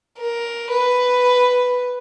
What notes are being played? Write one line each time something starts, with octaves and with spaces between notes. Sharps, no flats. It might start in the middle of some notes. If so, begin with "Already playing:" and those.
A#4
B4